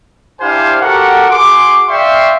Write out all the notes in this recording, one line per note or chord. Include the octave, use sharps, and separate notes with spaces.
D4 E4 G4 C5 F5 G#5
F#4 G4 A4 A#4 F#5
F#4 G#4 C6 D6
D5 E5 F5 G5 C6 C#6